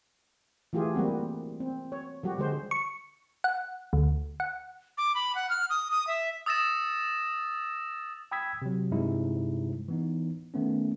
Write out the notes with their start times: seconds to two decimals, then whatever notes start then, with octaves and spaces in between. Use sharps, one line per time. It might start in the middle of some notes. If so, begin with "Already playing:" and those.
0.73 E3 A3 F4 G4 G#4
0.94 G3 A#3 C4 F#4
1.60 C4
1.92 C#5
2.23 F3 G3 F#4 G4
2.38 D3 G#3 C5
2.71 C#6
3.44 F#5
3.93 D2
4.40 F#5
4.97 D6
5.15 B5
5.35 F#5
5.50 F6
5.70 D#6
5.91 D#6
6.07 E5
6.46 D#6 E6 A6 A#6 E7
8.31 G5 B5 D#6 E6 G#6 B6
8.62 C3 F#3
8.91 G2 C3 G3 G#3 D#4 E4
9.88 E3 B3 D#4
10.54 D#3 A3 B3 C#4